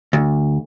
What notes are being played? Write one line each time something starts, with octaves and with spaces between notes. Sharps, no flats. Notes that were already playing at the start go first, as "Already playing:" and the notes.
D2